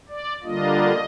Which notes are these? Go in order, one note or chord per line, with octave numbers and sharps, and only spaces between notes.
D5
D3 G3 A#3 D4 F4 D#5